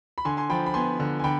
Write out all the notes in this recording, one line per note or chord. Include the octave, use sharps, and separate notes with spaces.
B5
D3 G#5 C6
G#5 C6
F3 G5 B5
B5
B3 G#5 C6
D3
G#5
D3 G5 B5